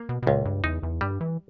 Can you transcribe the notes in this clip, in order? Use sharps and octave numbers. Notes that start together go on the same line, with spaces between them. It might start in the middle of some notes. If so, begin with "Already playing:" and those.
Already playing: A#3
B2
B2
C#2 A#2
G2
E2 D#4
E2
G2 G3
E3